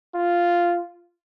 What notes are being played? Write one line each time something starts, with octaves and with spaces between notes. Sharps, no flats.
F4